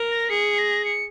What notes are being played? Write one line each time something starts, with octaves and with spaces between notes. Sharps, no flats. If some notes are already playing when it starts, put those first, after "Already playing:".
Already playing: A#4
A#6
G#4 C#7
A#6
C#7